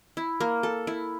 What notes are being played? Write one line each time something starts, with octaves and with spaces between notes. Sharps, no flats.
E4
A#3
A4
E4